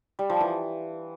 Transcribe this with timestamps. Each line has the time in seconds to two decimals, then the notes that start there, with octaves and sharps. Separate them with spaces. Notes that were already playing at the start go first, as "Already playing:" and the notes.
0.19 G3
0.30 F3
0.40 E3